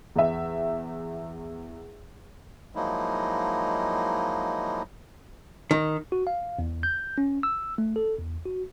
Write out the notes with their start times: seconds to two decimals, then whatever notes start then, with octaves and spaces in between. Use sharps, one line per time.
0.16 E2 E5
2.75 F3 F#3 G#3 A#3 D#4 E4
5.71 D#3
6.12 F#4
6.27 F5
6.59 E2
6.83 G6
7.18 C#4
7.43 E6
7.78 A3
7.96 A4
8.19 E2
8.46 F#4